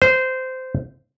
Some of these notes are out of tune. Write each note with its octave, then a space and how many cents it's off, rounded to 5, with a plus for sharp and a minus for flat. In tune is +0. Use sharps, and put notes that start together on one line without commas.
C5 -15